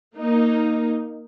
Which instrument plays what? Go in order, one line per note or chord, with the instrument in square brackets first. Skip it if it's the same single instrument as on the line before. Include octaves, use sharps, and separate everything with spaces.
[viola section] A#3 D#4